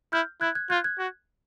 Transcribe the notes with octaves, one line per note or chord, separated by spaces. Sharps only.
E4 F6 G6
E4 F#6 G#6
F#6 G#6
F4 F#6 G#6
F#6 G#6
F#4